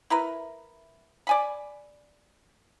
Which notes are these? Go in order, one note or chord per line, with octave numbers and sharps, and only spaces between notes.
E4 A#4 B4
D5 G#5 B5